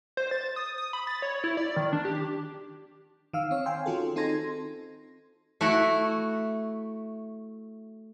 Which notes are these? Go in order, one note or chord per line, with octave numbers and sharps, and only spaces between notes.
C5
A6
D#6
D#6
B5
A6
C#5
E4
D5
D#3
D4
G4
D#3 F5 E6
C4 C#5
F5 G5 G#5 C6
D#3 C#4 F4 F#4 G#4 A4
C4 D#4 A4 C6 G#6 A#6
A3 E4 F#4